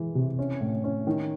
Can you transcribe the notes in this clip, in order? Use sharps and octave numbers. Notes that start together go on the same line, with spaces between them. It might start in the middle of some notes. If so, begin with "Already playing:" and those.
Already playing: E3 G#3
C3
C#4
A2
C#4
D#3